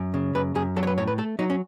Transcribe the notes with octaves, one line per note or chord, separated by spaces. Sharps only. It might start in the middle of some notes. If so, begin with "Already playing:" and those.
Already playing: F#2
C#3
F#2 B4
F#2 G#4
F#3 A4
C#5
B4
A2 C#5
B4
A3 A4
F#3 D#4
C#4